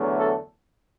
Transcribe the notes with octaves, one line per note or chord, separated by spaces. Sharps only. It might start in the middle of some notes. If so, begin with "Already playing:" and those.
Already playing: E2 D3 F#3 A3
A4